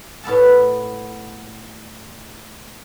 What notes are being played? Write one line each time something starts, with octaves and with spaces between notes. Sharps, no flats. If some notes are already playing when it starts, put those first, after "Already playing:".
A2 B3 A4 A5